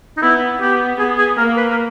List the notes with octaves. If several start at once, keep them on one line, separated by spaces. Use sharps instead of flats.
D#4
B3 E4
B3 G4
B3 G#4
G#4
A#3 A#4
B4
A#4